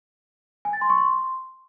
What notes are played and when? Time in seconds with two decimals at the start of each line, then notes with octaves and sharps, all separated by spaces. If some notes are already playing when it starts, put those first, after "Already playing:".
0.65 G#5
0.73 A6
0.81 C6
0.90 C#6
0.98 C6